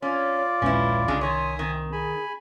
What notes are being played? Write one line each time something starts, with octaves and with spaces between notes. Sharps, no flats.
C#4 F4 C#5 D5
A#1 D#2 G#3 C#4 E4 B4
C2 C#3 G#3 D4 G#4
D#3 C#5 E5 G#5 C6 D#6
D#3 C4
G#4 G#5 B5